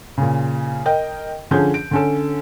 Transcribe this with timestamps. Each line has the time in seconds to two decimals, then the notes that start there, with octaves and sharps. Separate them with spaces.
0.17 A#2 C#3
0.86 A#4 D#5 G5
1.51 D3 F3 C#4 G#4 G6
1.74 D7
1.91 D3 C#4 A4